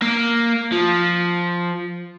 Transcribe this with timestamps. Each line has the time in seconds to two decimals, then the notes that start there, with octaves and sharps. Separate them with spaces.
0.02 A#3
0.72 F3